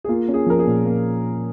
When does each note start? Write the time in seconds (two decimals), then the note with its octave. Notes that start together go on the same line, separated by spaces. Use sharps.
0.04 G#4
0.08 A#3 F4
0.28 C#4
0.34 G#4
0.46 F3 A#4
0.59 G#4
0.67 A#2
0.86 A#3